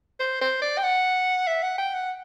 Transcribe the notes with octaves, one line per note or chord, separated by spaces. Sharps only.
C5
C5
D5
G5
F#5
E5
F#5
G5
F#5